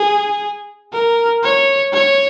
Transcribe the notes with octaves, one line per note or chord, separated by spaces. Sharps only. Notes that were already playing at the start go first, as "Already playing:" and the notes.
Already playing: G#4
A#4
C#5
C#5